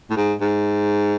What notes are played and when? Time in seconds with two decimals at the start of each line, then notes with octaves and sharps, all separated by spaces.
0.10 A2
0.17 G#2
0.41 G#2